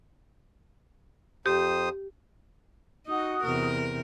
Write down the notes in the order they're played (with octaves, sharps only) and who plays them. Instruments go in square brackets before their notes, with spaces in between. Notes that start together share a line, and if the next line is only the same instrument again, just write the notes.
[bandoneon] F2 C5 D#6 [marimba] G4
[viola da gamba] D#4 [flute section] F#4 D#6
[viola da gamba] E2 C3 A#4